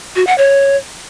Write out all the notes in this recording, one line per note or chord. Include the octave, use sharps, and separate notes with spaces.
F#4
F#5
C#5